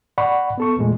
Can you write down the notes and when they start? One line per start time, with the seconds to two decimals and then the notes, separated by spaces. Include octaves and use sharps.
0.18 D5 F#5 B5 C#6
0.58 B3 A4 C#6
0.77 E2 A#2 G#3 A3